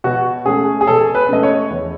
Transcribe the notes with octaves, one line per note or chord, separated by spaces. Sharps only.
B2 F#4
A3 C#4 G#4
G#4
B2 A4
B4
A3 C#4 D#5
C#5
E2